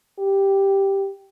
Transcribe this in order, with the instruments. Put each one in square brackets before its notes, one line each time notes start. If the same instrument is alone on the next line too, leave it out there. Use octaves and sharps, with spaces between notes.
[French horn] G4